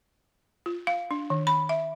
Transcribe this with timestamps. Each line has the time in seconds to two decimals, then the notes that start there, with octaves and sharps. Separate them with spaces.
0.66 F4
0.87 F5
1.11 D4
1.30 D#3
1.47 B5
1.69 E5